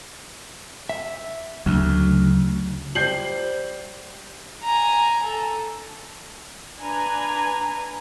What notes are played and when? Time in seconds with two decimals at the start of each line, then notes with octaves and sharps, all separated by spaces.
0.89 E5
1.66 D2 C#3 F#3
2.95 G3 C5 G6 C7 F#7
4.64 G#5 A#5
5.24 A4
6.82 D4 B4 G#5 A#5